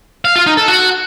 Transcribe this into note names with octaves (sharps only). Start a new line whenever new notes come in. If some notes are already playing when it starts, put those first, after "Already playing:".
F5
F4
D#4
A4
F#4